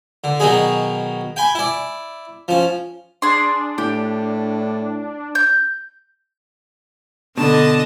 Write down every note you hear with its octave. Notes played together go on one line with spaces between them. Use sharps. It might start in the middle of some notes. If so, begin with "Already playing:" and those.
D3
B2 D#3 F#3 D#4 G#4
G5 G#5 B5
E4 D5
F3 C#4
D4 G#4 C6
A2 G4
G6
B2 D3 D4 D#5 A5